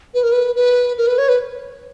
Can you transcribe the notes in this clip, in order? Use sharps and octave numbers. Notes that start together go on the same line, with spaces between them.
B4
A#4
B4
B4
A#4
B4
C#5
B4